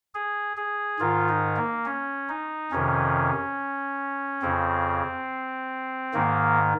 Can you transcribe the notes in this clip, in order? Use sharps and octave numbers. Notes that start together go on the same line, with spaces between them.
G#4
G#4
G#2 D#3 F4
D#4
A#3
C#4
D#4
F2 C3 D#3 C#4
F2 C#3 C4
G#2 D#3 A#3